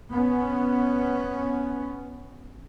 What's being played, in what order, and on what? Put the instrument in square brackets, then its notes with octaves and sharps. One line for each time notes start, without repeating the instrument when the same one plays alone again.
[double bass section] B3 C#4